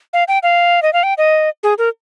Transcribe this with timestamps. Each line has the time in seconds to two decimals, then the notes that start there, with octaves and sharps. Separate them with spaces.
0.13 F5
0.28 G5
0.43 F5
0.83 D#5
0.93 F5
1.03 G5
1.18 D#5
1.63 G#4
1.78 A#4